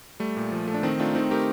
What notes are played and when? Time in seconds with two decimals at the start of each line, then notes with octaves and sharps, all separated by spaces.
0.20 G3 A3
0.37 A#2
0.52 F3
0.68 A3
0.74 D4
0.83 D#3 C4 D#4
0.99 A3 D4 F4
1.15 D#3 C4 D#4
1.31 A3 G4 A#4